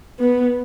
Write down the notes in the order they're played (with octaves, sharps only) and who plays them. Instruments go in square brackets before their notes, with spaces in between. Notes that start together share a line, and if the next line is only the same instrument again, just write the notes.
[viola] B3